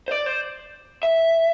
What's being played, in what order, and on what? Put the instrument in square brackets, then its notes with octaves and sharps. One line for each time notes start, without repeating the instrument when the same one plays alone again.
[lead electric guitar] C5
D5
C5
E5